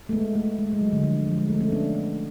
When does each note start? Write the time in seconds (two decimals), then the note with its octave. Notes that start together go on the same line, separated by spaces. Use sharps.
0.09 A3
0.13 G#3 B3
0.35 A3
0.59 G#3
0.73 G#3
0.81 F#3
0.93 D3
1.03 F3
1.27 F3
1.38 G#3
1.50 A3
1.61 A3 C#4
1.72 B3 D4